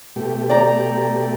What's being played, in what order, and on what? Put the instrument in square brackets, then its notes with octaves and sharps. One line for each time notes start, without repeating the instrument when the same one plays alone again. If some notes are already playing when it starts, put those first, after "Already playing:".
[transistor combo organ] B2 A3 G4
[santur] D5 G5 A#5